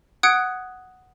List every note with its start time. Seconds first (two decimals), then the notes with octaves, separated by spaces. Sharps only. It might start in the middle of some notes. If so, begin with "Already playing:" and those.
0.23 F#5 D#6 F#6 G#6 C#7 D7